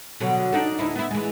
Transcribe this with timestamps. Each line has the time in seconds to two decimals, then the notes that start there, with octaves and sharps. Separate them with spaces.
0.20 B2 D3 F#3
0.52 D4 D#4 A4
0.79 D2 D#4 E4
0.95 B3 E4
1.11 E3 G#3